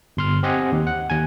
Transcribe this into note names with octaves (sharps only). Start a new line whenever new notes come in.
G1 C6 F6
C4 G4 D#5 F#5 G#5
D#2
F#5
D#2 G#5